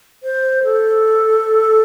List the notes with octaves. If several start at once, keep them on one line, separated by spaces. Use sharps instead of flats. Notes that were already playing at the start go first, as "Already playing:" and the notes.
C5
A4